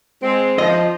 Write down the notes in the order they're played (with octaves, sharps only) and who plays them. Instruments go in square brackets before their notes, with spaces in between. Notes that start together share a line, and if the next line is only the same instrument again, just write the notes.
[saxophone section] G#3 C4
[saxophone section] F3 [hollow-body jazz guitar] D#5